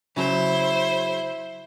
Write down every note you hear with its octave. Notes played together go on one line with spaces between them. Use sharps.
C#3 F#3 E4 C5